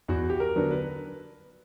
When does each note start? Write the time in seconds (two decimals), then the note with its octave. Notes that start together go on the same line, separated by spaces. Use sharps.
0.08 E2 F#4
0.30 G4
0.40 A#4
0.56 D3 F#3 B3 D4
0.71 B4